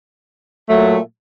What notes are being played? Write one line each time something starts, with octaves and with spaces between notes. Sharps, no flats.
A#2 F#3 A3